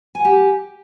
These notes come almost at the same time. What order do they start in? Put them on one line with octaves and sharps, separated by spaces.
G#5 F#5 G4